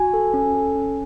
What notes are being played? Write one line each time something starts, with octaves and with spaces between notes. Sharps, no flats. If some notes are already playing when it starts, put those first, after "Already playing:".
Already playing: F#4 G#5
A4
C#4
A4
C#4